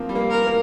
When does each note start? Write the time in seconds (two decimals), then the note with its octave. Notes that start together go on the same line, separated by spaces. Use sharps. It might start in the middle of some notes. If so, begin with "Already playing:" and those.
Already playing: F3 A#3 C4
0.09 G3
0.15 A#3
0.30 A#4
0.46 A#3